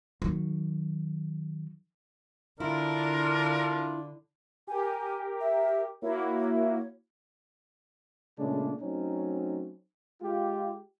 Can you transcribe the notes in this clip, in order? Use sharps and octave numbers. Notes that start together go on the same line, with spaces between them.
D#3 F#3
D3 D4 E4 F4 A#4
G4 A#4 G#5
E5
A#3 E4 F#4 C#5
A#2 C#3 G#3 A3 C#4 D4
F#3 A3 C4 C#4 D#4
G#3 F4 G4